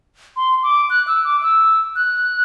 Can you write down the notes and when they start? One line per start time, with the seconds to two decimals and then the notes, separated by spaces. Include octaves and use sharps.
0.36 C6
0.63 D6
0.90 F#6
1.07 E6
1.24 D6
1.43 E6
1.95 F#6